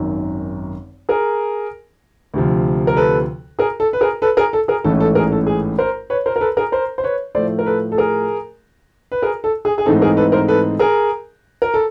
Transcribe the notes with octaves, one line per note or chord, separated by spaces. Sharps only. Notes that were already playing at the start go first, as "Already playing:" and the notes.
Already playing: G#1 F#2 D#3
G#4 A#4
D2 C3 F3
A#4
A4 B4
G#4 A#4
A4
B4
G#4 A#4
A4 B4
G#4 A#4
A4
G#4 A#4
A1 G#2 E3 A3 C#4 A4
A4
G#4 A#4
A4
G#4
A#4 C5
B4 C#5
A#4 C5
A#4
A4 B4
G#4 A#4
A#4 C5
C5
B4 C#5
A2 F3 A3 C5 D5
A#4
A4 B4
A4
G#4 A#4
B4
G#4 A#4
A4
G#4
G#4
G#2 E3 A3 C4 D#4 A4
G#4 A#4
A4 B4
A#4 C5
A4 B4
G#4 A#4
A#4
A4